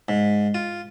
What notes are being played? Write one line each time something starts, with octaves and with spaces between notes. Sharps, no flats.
G#2
F4